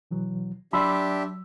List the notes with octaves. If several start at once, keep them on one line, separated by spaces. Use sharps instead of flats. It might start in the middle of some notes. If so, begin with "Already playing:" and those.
B2 E3 F#3
F#3 D4 G4 E5 B5 C6 E6